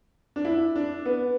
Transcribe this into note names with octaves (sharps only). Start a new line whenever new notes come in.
D4
E4
D4
B3